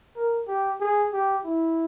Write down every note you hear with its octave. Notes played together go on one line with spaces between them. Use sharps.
A#4
G4
G#4
G4
E4